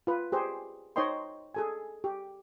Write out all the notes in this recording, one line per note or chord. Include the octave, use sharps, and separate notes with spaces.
F4 B4
G4 G#4 C5
D#4 C5 C#5 D#5 G5 C6
G#4 A4 G#5
G4